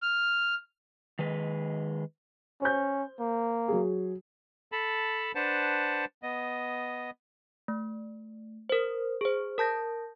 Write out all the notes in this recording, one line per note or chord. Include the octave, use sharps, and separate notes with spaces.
F6
D#3 G#3 B4
C#4 C5 G6
A#3
F#3 G#4
A4 A5 B5
D4 B4 C5 F#5 A5
B3 D#5
A3
A#4 C5
G#4 C5
A#4 A5 G6 A#6